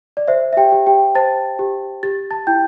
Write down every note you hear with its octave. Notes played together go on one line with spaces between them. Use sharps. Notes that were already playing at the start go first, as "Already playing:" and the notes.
D5
C5 E5
E5
G4 G5
G4
G4 G5
C5 A5 A6
G4
G4 A6
A5 A6
E4 G5 G6